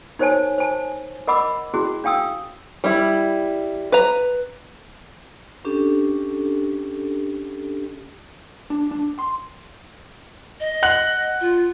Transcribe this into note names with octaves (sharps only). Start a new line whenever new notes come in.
D#4 A#4 C5 C#5 G#5 A5
C5 G#5 A5
A#4 D#5 F#5 B5 D6 E6
C#4 E4 F#4 G#4
D4 F5 G5 D#6 E6
G3 E4
B4 A#5
C#4 D4 G4 A4
D4
D4
C6
D#5
F#5 F#6 F#7
F4